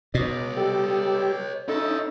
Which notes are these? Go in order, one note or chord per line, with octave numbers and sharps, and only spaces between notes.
B2 C#5 D#5
G3 G4 A4
C#4 D#4 E4 A4 D#5